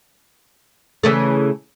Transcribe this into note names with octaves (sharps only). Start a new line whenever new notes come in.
C#3 E3 A3